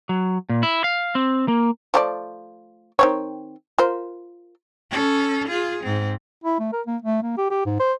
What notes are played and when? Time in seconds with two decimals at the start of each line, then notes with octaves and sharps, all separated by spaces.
0.09 F#3
0.49 A#2
0.63 E4
0.84 F5
1.15 C4
1.48 A#3
1.94 F3 A3 D5
2.99 D#3 C4 C#5
3.78 F4 A#4 C5
4.91 C#4 A4
5.48 F4 G#4
5.84 G#2 C4
6.44 E4
6.59 A3
6.73 A#4
6.87 A#3
7.02 A3
7.23 A#3
7.37 G4
7.51 G4
7.66 G#2
7.80 C5